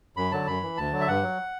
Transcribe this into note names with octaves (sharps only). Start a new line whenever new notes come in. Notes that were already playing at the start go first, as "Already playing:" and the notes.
F#2 B5
D3 F#3 A5
F#2 B5
E3
D2 A5
D3 F#3
E5
G2 F#5
F#3